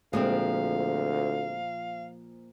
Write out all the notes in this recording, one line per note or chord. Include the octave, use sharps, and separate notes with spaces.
D2 A#2 F3 G#3 A#3 C4 F5